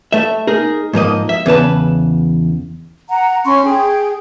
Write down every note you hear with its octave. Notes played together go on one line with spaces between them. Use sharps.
A3 E5
D#4 G#4 A#4
G#2 F3 A#3 D#5
E5
E2 C#3 B4 A5
F#5 A#5
C#4 C6 C#6
G#4 G5